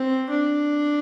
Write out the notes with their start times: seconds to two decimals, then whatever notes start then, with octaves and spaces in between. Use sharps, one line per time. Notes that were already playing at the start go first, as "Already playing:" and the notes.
Already playing: C4
0.30 D4